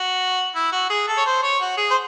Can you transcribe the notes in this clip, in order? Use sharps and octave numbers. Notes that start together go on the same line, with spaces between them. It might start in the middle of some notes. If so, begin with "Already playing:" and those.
Already playing: F#4
E4
F#4
G#4
A4
C#5
C5
C#5
F#4
G#4
C5